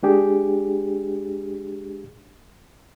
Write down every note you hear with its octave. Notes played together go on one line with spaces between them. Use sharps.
G#3 D4 G4 G#4